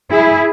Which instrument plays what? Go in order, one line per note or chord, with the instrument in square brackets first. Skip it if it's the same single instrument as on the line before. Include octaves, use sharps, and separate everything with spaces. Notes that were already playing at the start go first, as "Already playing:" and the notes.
[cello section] E4 G#4